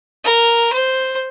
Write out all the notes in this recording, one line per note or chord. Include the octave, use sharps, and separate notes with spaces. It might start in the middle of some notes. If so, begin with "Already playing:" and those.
A#4
C5